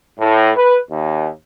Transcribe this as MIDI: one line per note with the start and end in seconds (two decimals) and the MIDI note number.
0.19 0.50 45
0.55 0.77 71
0.90 1.29 39